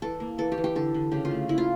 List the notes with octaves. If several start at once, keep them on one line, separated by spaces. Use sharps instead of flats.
E3 A4
A#3
E3 A4
G4
E3
G4
D3 A4
D3
C#3 G4
F4
A3
A#3 E4
F4